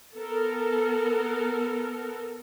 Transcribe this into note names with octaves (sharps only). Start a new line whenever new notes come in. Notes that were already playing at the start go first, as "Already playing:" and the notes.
B3 A4 A#4